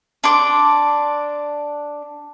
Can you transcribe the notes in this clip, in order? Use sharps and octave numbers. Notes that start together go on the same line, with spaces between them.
D4 C6 D6